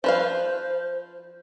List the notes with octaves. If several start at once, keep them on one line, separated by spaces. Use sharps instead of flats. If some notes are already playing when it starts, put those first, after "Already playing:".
F3 B4 C5 F5